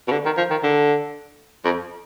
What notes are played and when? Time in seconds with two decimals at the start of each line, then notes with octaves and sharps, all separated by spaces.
0.08 B2
0.12 D3
0.26 D#3
0.37 F3
0.50 D#3
0.64 D3
1.65 F2